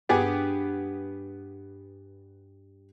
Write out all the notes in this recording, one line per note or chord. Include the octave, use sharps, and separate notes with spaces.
G2 B3 G4 G#4